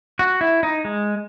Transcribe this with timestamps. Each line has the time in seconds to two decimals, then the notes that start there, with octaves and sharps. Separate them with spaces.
0.19 F#4
0.41 E4
0.63 D#4
0.85 G#3